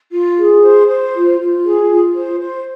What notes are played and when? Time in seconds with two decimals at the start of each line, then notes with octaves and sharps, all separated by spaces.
0.12 F4
0.37 G#4
0.62 C5
0.88 C5
1.14 F4
1.39 F4
1.64 G#4
1.90 F4
2.15 C5
2.41 C5